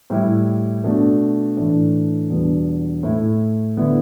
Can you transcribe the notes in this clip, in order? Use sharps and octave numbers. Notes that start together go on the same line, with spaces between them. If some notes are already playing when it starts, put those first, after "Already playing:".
A2 G3 E4
B2 A3 D4
A2 E3 A3 D4
E2 B2 G3 B3 D4
A2 A3 E4
D3 B3 E4